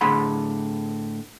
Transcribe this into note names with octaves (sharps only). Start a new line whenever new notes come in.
A2 D3 G#4 F#5 B5 C6